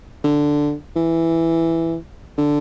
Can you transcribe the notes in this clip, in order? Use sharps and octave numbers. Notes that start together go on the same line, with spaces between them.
D3
E3
D3